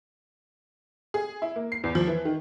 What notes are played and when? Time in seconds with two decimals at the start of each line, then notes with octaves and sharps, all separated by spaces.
1.14 G#4
1.42 E4
1.56 A#3
1.72 C7
1.84 E2
1.95 F3
2.08 E3
2.25 D#3